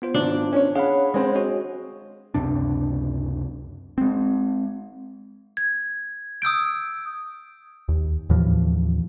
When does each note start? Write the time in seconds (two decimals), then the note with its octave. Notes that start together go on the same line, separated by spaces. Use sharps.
0.02 B3 F4 C5
0.14 G#1 D4
0.53 C#4 C#5
0.75 G#4 C#5 F5 F#5 B5
1.14 G#3 C4
1.35 F#4 G#4 D#5
2.34 C#2 F#2 C3 D4
3.98 G#3 C4
5.57 G#6
6.42 D#6 E6 G6 D7
7.88 D#2
8.29 D#2 A2 E3 F3